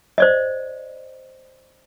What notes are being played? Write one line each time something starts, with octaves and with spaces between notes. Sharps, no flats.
C5 D5 D#5